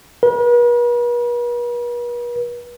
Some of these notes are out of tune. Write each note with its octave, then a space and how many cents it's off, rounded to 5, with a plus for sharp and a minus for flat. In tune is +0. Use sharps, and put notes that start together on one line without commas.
B4 -45